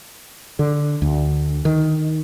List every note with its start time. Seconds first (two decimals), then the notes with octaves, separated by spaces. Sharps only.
0.59 D3
1.02 D2
1.65 D#3